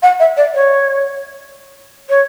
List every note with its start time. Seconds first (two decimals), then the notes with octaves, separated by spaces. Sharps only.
0.03 F#5
0.20 E5
0.37 D5
0.54 C#5
2.09 C#5